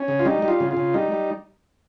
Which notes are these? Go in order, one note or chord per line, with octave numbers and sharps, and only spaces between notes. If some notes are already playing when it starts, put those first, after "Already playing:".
Already playing: C#4
C#3
F4
G3 D#4
G3
F4
C#3
F4
C#3
G3 D#4
G3